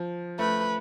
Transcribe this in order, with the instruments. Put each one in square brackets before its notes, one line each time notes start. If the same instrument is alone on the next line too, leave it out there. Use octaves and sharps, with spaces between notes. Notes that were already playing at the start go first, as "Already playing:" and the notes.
Already playing: [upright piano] F3
[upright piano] A3 [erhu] B4